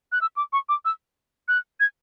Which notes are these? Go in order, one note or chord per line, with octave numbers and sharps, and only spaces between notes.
F#6
E6
D6
C#6
D6
E6
F#6
G#6